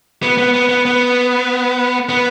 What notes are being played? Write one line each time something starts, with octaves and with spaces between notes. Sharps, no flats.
B3
B3
B3
B3
B3
B3